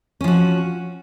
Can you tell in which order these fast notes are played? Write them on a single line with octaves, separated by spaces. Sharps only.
C#4 F3 F#4